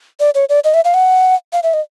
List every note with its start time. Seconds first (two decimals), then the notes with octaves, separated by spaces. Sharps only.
0.20 D5
0.35 C#5
0.49 D5
0.64 D#5
0.74 E5
0.85 F5
0.94 F#5
1.53 F5
1.63 E5
1.74 D#5